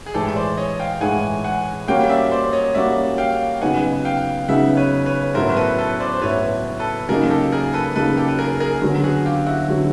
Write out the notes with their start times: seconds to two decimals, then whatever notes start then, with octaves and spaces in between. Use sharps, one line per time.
0.06 G#4
0.14 A2 E3 G#3 G4 A4
0.36 C5 D5
0.57 C#5 D#5
0.79 F5 G5
1.01 A2 E3 G#3 F#5 G#5
1.44 F#5 G#5
1.88 G3 A#3 C#4 F#4 F5 G5
2.09 D5 E5
2.32 C5 D5
2.53 C#5 D#5
2.74 G3 A#3 C#4 F#4 D5 E5
3.18 F5 G5
3.61 C#3 F#3 B3 D#4 F#5 G#5
4.04 F5 G5
4.48 C#3 F#3 B3 D#4 E5 F#5
4.77 B4 C#5
5.06 B4 C#5
5.34 A2 F#3 B3 E4 A#4 C5
5.49 C5
5.57 A4 B4
5.78 A4 B4
6.00 C5 D5
6.14 C5
6.21 A2 F#3 B3 E4 B4 C#5
6.79 A4 B4
7.08 C#3 F#3 A#3 D#4 G#4 A#4
7.30 G4 A4
7.52 G#4 A#4
7.74 A4 B4
7.95 C#3 F#3 A#3 D#4 A4 B4
8.17 G4 A4
8.28 B4
8.39 G#4 A#4
8.60 G#4 A#4
8.82 D3 F#3 B3
9.04 F#4 G#4
9.25 F4 G4
9.47 E4 F#4
9.68 D3 F#3 B3